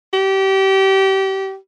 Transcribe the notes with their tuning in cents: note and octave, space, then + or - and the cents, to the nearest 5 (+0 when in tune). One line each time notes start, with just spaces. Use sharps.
G4 -25